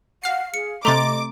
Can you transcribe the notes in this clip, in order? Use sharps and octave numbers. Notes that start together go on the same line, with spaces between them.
F5 F#5 C7
G#4 C#7
C3 A3 D#5 A#5 C6 D6 A6